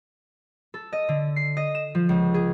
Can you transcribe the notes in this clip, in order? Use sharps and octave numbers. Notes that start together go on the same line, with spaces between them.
A4
D#5
D3
C7
D#5
E7
F3
C#2
G#4